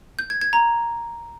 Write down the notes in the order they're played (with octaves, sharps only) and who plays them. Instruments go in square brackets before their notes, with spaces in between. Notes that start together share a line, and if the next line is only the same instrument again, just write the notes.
[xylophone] G6
G#6
G#6
A#5